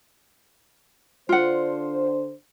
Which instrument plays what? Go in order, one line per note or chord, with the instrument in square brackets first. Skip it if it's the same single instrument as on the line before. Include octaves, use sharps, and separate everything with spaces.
[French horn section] D3 D4 C5 [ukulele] F4 F#5